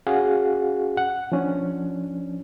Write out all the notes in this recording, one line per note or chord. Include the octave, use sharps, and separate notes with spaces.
C#4 F#4 G#4 F5 F#5
F#5
F3 C#4 D4